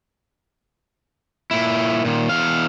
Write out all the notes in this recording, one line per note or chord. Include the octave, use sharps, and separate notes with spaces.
A#2 E4
A#2 D#3
E2 F5